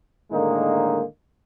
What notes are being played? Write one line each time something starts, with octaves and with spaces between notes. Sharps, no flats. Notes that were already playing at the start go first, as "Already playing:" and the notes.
A2 D3 D#3 G#3 A#3 D#4